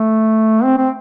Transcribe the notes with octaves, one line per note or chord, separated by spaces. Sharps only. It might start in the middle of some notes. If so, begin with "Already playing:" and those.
Already playing: A3
C4
C4